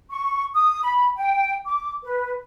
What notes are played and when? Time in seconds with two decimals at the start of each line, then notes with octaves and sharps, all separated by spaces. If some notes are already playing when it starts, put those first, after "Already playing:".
0.11 C#6
0.54 D#6
0.83 B5
1.17 G5
1.65 D6
2.03 B4